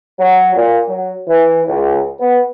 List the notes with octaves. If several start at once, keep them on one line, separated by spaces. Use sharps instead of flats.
F#3
A#2
F#3
E3
C#2
B3